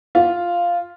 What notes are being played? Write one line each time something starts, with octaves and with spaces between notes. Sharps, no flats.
F4